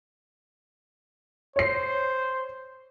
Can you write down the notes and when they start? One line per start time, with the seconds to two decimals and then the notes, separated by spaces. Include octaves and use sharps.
1.56 C5 C#5 C7